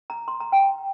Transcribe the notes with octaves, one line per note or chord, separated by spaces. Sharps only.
A#5
C6
A#5
G5